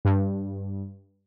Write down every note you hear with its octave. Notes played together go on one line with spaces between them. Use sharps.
G2